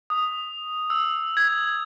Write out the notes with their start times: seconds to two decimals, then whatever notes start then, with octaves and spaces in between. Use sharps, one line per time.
0.10 D#6
0.90 E6
1.37 G#6